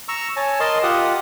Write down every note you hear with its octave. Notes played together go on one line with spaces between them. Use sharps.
A#5 C#6 E6
C#5 G#5 A5
A#4 D#5 A5 C6
F4 G4 F#5 D#6